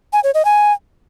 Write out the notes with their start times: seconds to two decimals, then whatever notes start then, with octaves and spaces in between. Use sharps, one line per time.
0.13 G#5
0.24 C#5
0.34 D#5
0.45 G#5